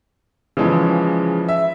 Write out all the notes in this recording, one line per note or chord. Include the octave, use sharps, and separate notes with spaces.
C#3 E3 F3 G#3
E5